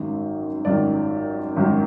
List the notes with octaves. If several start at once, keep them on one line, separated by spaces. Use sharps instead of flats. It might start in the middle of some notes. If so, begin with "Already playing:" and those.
Already playing: G#1 F#2 D#3
G#1 F#2 D#3 D5
G#1 F#2 D#3